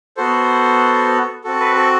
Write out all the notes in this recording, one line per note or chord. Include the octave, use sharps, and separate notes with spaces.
B3 F#4 A4 C5
C4 F#4 A4
B4
A4